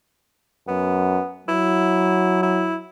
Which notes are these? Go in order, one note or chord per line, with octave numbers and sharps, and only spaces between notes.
F#2 B3
F#3 E4
E4